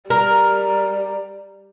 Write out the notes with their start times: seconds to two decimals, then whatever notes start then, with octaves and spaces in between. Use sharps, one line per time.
0.10 G3 A#4